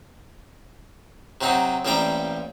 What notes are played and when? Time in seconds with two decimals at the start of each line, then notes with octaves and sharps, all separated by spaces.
1.41 C3 F#3 C4 D#4
1.85 A1 G3 A#3 C4 G5 A#5